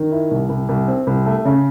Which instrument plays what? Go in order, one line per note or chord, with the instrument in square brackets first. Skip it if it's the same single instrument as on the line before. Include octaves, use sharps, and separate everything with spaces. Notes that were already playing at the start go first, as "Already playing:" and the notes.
Already playing: [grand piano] D#3
E4
C2
C2
C2
C4
C2
A3
C#3